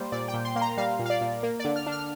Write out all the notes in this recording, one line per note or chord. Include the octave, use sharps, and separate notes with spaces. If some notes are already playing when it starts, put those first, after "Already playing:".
Already playing: G3 A#3 C5 D5
A#2 D5
G5
A#2
C6
A#3 C6
A#5
G3 F5
A#2
F5
D5
A#2
A#3
D5
D3
F6
D4
F6